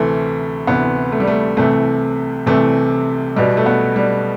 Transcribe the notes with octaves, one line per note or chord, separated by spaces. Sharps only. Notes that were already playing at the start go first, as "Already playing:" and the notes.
Already playing: D2 C3 E3 A3
D2 C3 E3 B3
A3
G3
A3
C2 C3 E3 A3
C2 C3 E3 A3
B1 B2 G3
A3
B3
G3